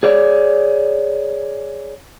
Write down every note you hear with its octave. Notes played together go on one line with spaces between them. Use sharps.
G#4 C#5 D5